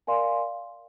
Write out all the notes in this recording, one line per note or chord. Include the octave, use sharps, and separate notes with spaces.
A#4 D5 F5 G#5 C6